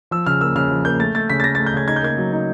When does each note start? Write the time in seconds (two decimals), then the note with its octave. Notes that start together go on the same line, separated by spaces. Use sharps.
0.11 F3 E6
0.26 C#3 F6
0.41 A#3 E6
0.56 C#3 F6
0.71 F3
0.85 A#3 G6
1.00 A3 A6
1.15 A3 A6
1.30 C#3 B6
1.40 A6
1.44 A3 A#6
1.55 A3 A6
1.66 G6
1.74 C#3 G#6
1.88 D#4 G#6
1.96 G6
2.03 A#3 G#6
2.18 F#3
2.33 D#4